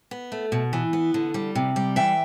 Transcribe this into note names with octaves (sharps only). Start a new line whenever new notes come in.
B3
A3
B2
E3
B3
D3
G3
C3
G3
E3 E5 G5